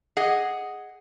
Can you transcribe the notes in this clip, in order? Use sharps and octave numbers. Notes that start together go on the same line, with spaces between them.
G#4 D#5 F#5